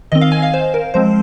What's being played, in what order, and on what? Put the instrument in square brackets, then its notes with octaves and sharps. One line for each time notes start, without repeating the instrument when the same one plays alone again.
[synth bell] D#3 C4 D#5
F5
G#5
F5
C5
A#4
F3 G#3 C4 C5